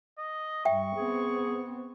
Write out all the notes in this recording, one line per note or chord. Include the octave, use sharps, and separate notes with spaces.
D#5
G2 G3 E5 G5 C#6
B3 C4 G#4